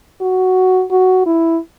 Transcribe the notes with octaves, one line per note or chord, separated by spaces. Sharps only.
F#4
F#4
E4